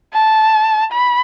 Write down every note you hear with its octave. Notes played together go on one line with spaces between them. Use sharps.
A5
B5